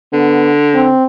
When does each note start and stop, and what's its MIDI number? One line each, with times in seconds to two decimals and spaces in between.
0.13 0.93 50
0.13 0.52 59
0.75 1.05 60